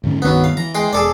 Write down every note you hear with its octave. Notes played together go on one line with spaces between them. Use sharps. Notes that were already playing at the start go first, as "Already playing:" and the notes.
G#2 D3 C#4
C2 G2 D#3 F#3 B3
F5
E3 A#5
G#3 G5 C6
E1 G#4 A4 D5